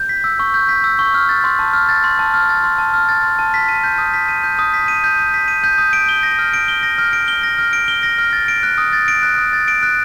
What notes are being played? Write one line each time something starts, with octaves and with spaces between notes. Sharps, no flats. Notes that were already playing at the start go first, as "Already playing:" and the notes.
Already playing: G6
B6
E6
C#6
G6
B6
E6
C#6
F6
A6
C6
A5
F6
A6
C6
A5
F6
A6
C6
A5
F6
A6
C6
A5
B6
D#7
G6
D#6
B6
D#7
G6
D#6
B6
D#7
G6
D#6
B6
D#7
G6
D#6
D7
G7
A#6
F6
D7
G7
A#6
F6
D7
G7
A#6
F6
D7
G7
A#6
F6
A6
D7
F#6
D#6
A6
D7
F#6
D#6
A6
D7
F#6